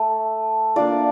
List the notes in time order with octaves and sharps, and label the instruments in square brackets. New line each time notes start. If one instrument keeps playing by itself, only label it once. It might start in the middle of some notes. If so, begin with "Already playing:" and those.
Already playing: [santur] A3
A#3 D4 F4 D5